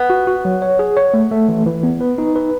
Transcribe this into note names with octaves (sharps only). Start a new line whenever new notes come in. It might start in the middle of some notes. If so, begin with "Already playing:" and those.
Already playing: B3
F#4
F#4
F#3
C#5
G#4
C#5
A3
A3
E3
E3
B3
B4
D#4
B4